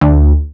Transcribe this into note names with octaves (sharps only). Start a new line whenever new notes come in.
D2